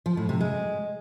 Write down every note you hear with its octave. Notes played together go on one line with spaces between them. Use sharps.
F3
A2
C3
G#3